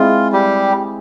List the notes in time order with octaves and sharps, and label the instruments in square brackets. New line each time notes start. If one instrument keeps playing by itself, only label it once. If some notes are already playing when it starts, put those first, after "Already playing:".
Already playing: [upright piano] G#3 C4 E4 G#4 [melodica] F4
[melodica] G3 G4